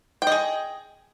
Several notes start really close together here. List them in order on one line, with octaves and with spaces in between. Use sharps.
G5 D#5 G#4